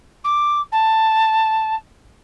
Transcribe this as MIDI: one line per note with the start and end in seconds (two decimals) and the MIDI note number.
0.24 0.61 86
0.72 1.75 81